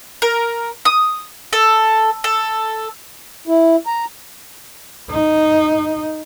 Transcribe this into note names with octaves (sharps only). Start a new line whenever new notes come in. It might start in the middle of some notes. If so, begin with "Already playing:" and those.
A#4
D#6
A4
A4
E4
A#5
D#4